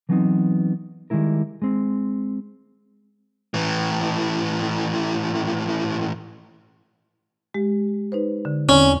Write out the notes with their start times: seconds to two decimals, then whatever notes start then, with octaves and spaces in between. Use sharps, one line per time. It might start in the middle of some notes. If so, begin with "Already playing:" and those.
0.09 E3 F#3 A3 B3 C4 D#4
1.10 D#3 G3 G#3 E4 A#4
1.62 G#3 C4
3.54 A2 E3
7.54 G#3 G4
8.12 D#4 B4 C5
8.45 D3
8.69 E2 C4 C#4 D5